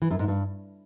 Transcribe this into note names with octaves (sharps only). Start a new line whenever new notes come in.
E3
F#2
G#2
G2